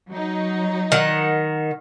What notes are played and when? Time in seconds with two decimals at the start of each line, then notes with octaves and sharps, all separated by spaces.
0.10 F#3 D#4
0.92 D#3 F#5